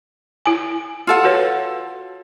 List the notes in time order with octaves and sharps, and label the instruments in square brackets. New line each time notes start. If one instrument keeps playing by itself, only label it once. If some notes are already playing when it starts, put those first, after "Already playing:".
[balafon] E4 G#5
[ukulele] F4 A4 F#5
[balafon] F#4 B4 C#5